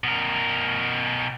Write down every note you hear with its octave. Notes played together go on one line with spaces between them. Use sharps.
B2 A#4